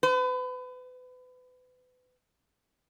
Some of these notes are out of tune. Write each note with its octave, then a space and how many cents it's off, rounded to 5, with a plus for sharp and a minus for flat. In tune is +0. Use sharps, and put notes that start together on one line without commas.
B4 +35